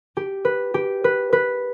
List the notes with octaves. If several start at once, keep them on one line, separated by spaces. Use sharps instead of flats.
G4
B4
G4
B4
B4